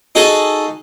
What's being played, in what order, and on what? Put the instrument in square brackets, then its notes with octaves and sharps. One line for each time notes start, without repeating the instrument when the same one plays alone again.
[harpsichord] D#4 F#4 G#4 A4